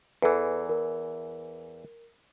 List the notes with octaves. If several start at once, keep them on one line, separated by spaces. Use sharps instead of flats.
E2 E3 A4 B4
A#4